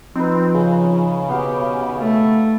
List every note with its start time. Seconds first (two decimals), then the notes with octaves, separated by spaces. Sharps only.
0.16 F3 C4 D#4 B4
0.54 C#3
1.29 B2 B3 G4 F5
1.99 A3